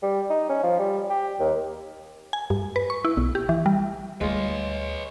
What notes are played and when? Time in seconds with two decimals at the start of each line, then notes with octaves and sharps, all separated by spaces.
0.03 G3
0.30 D#4
0.49 C#4
0.63 F3
0.79 G3
1.10 G4
1.40 D#2
2.33 G#5
2.50 G2
2.76 B4
2.90 C#6
3.05 E4
3.17 B1
3.35 G4
3.49 E3
3.66 G3
4.21 D2 G3 G#3 F4 B4 C#5